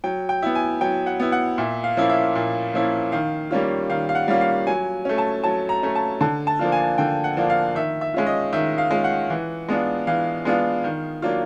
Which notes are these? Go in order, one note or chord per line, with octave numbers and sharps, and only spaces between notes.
F#3 G5
G5
B3 E4
G#5
F#3 G5
F#5
B3 E4
F#5
A#2 E5
F5
F3 A#3 C#4 E4
E5
A#2
F3 A#3 C#4 E4
D#3 F5
G3 A#3 C#4 F4
D#3 F5
F5
F#5
G3 A#3 C#4 F4
F5
F#3 G#5
A3 C#4
A5
F#3 A5
A#5
A3 C#4
A5
D3 A5
A5
F3 A#3 D4 F4
G#5
D3 G5
F#5
F3 A#3 D4 F4
F5
D#3 E5
E5
G#3 C#4 F4
D#5
D#3 E5
F5
G#3 C#4 F4
F#5
E3
G#3 B3 D4 F4
E3 F5
G#3 B3 D4 F4
D#3
F#3 A#3 D4 F4